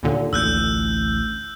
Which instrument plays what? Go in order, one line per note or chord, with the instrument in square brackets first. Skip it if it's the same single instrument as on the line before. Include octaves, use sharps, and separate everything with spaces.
[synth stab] D#2 A#2 D3
[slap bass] A1 D2 [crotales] E6 F#6 G6